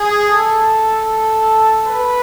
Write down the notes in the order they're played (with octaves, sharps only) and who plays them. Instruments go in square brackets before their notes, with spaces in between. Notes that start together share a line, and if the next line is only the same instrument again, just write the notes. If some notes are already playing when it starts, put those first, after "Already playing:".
Already playing: [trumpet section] G#4
A4
B4